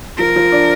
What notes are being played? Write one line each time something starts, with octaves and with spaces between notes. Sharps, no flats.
F3 A#4
F3
D4